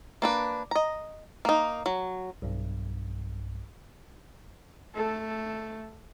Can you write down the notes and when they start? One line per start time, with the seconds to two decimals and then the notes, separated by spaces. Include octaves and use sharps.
0.22 A#3 D4 B4
0.71 D#5 A#5
1.45 A#3 D#4
1.86 F#3
2.42 B1 G2
4.95 A3 A4